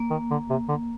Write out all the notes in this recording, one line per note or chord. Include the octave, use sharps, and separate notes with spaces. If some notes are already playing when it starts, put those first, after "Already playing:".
Already playing: A#3
D#3
D3
C3
D3